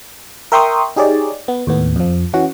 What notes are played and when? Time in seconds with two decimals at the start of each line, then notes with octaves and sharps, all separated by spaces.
0.52 A#4 E5 G5 C6 C#6 D#6
0.96 D#4 G4 G#4 C#5 D5
1.48 B3
1.67 D#2 A2 B3
1.96 F2 F3
2.33 E3 C#4 F#4